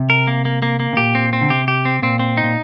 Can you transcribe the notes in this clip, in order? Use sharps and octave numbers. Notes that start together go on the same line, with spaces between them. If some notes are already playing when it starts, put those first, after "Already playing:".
Already playing: C3
A#4
A#3
A#3
A#3
A#3
C3
A#2 G4
C4
C4
D3
C3 G4
G4
C4
A#2 C4
C4
D#4
A#2